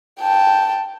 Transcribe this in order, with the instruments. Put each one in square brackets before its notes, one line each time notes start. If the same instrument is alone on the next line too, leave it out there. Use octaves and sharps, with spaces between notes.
[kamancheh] G5 A5